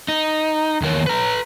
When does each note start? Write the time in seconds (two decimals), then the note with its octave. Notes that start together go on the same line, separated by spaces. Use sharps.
0.08 D#4
0.82 E2 D#3 A#4 C#5
1.07 B4 A#5